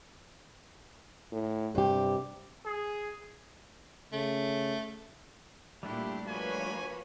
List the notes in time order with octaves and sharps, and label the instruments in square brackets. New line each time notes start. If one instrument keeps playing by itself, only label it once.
[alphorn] A2
[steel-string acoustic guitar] G2 G4 [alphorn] C3
[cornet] G#4
[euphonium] C#3 [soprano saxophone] A3
[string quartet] A#2 E4 G4 [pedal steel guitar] G3 A3 D4
[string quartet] F3 A#3 F#4 [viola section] B4 C#5 B5 [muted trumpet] G#5